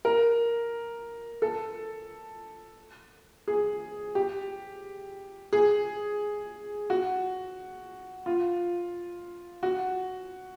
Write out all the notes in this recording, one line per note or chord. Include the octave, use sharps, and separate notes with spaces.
A#4
A4
G#4
G4
G#4
F#4
F4
F#4